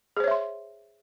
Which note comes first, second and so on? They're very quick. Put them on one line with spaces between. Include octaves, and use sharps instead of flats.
G#4 C5 C#5 E5 C6